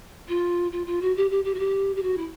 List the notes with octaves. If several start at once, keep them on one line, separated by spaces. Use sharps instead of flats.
F4
F4
F4
F#4
G4
G4
G4
F#4
G4
G4
F#4
E4